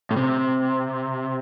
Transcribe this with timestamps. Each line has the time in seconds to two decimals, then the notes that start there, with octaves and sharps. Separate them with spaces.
0.11 A2
0.16 C3